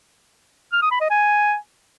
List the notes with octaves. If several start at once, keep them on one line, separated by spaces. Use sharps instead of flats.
F6
D#6
B5
D#5
G#5